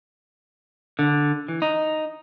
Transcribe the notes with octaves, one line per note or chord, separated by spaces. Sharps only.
D3
E3
D#4